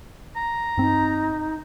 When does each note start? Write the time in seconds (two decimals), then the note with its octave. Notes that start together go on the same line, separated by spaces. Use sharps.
0.36 A#5
0.77 G2 C4 D#4